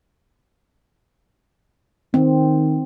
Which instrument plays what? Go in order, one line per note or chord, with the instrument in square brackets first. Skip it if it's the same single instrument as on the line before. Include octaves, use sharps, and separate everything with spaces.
[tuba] D#3 [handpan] C4